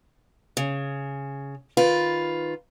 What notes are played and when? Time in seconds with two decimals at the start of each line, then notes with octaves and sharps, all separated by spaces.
0.57 C#3
1.77 D#3 F4 B4